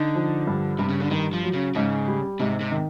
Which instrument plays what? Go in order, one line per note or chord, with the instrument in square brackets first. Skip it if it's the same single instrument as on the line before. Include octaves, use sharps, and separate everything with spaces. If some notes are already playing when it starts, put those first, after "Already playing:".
Already playing: [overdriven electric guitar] D3 [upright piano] D#4
[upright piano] F3
G2
[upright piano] G2 [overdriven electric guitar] C3
[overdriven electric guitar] C#3
D3
[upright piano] G2 [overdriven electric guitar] D#3
[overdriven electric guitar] F3
[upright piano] F#3
[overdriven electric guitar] C#3
[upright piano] G#2 [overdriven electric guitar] C#3
[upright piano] G3
[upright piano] G#2 [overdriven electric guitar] C3
[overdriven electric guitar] C3
[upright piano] D#3